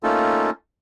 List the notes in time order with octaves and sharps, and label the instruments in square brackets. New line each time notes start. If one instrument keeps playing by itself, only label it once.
[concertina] A3 A#3 C#4 D#4 F4 A4